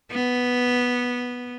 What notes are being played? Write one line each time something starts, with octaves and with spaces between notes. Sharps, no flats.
B3